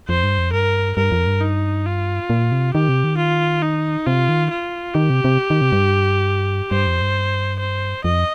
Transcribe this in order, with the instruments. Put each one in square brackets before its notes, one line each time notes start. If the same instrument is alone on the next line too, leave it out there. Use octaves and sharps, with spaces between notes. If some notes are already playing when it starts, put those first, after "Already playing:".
[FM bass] F2 [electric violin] C5
[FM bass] G2
F2
[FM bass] G2 [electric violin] A#4
[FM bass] G2 [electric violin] A#4
[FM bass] F2
G2
[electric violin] D#4
F4
[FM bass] A#2
C3
[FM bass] D#3 [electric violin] G4
[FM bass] C3
D#3
[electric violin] F4
D#4
[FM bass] C3 [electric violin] F4
[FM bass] D#3
[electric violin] F4
[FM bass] D#3 [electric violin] G4
[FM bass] C3
C3
D#3
C3
G2
[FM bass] G2 [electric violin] C5
[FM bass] F2
G2
[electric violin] C5
[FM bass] F2 [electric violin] D#5